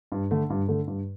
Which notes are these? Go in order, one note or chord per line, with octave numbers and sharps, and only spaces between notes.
G2
D3 A3
G2
D3 A3
G2